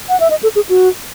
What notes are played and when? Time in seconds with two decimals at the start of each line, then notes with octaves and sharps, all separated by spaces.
0.09 F#5
0.20 E5
0.30 D#5
0.43 A4
0.56 G#4
0.69 F#4